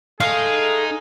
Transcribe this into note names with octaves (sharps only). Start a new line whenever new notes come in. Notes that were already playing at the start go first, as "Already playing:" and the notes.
G#3 A3 D#4 G#4 F5